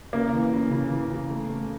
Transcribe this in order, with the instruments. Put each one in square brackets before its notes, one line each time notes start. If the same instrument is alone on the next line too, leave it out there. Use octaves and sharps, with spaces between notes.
[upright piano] C#3 [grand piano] A#3
[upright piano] E3
C#3
C#3
E3
C#3
A3
A3